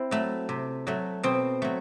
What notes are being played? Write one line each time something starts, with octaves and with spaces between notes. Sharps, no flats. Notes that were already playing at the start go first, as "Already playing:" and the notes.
Already playing: C4 E4
F#3 A3
C3
F#3 A3
B2 C4
F#3 A3